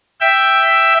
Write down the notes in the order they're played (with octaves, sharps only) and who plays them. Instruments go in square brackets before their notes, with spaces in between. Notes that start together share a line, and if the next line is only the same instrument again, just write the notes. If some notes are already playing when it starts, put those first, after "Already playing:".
[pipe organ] E5 G5